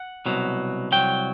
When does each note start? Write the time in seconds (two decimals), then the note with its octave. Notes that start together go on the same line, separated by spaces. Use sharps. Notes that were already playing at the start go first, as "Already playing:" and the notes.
Already playing: F#5
0.26 C2 B2 F#3
0.92 C2 B2 F#3 G5